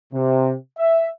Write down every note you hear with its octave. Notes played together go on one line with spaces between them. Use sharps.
C3
E5